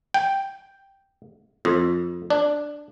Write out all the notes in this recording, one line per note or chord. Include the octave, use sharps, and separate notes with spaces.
G5
F2
D4